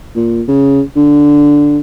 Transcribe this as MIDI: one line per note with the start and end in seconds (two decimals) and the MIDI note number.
0.16 0.43 46
0.48 0.81 49
0.96 1.80 50